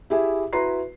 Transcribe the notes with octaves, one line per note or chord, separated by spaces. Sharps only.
E4 G4 G#4 E5
E4 F#4 B4 A#5 C6 C7